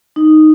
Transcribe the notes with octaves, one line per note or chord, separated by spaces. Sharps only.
D#4